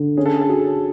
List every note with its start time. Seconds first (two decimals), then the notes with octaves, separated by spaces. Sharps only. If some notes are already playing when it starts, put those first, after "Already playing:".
Already playing: D3
0.17 C#4 G#4
0.26 A4
0.34 G#4
0.42 A4
0.49 F#4 G#4